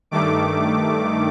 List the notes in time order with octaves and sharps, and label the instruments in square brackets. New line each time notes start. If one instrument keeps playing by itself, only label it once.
[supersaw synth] G2 D#3 A3 D6